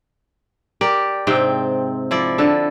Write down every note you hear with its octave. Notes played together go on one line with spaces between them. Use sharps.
G4 A#4 D5
G#2 C3 C4 G5
F3 E4 D5
D3 A4